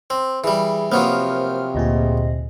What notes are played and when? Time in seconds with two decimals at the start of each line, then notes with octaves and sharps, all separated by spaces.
0.10 C4
0.44 E3 G3 G#4
0.92 C3 F3 F#3 A#3 B3 C5 F6
1.75 D2 A#2 G#4 D#5